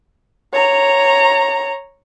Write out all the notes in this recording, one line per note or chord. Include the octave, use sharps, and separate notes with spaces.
C#5 A#5